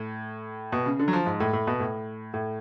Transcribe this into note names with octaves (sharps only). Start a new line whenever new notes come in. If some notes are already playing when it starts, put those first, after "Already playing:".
Already playing: A2
B2
C#3
D3
F#3
F3
G#2
A2
A2
B2
A2
A2